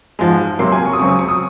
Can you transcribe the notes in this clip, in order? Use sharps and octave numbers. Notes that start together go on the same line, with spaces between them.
G#2 F3 G#3
C3 F#3 A#3 C6
G#5
C#6
D#6
F#2 C#3 F#3 C4 C#6
D#6
C#6
D#6